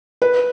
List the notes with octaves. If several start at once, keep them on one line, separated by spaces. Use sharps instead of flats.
B4